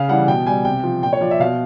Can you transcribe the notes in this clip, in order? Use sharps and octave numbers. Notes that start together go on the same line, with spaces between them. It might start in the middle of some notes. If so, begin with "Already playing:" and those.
Already playing: C#3 F5
E3 G3 F#5
B2 G5
G3 G#5
C3 G5
F3
A#2 G5
C#5
F3 D5
E5
B2 F5